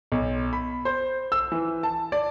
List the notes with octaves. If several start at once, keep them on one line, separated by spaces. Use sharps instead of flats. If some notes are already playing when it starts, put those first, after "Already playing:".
B1
B5
C5
E6
E3
A5
D5